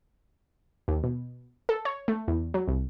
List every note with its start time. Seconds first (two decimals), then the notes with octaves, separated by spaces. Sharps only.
0.88 D#2
1.04 B2
1.69 A4
1.85 C#5
2.08 A3
2.28 E2
2.54 F#3
2.68 C2